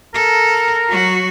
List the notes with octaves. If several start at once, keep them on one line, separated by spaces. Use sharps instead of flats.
A4 A#4
F#3 F#4